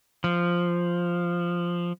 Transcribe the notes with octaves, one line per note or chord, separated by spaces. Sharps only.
F3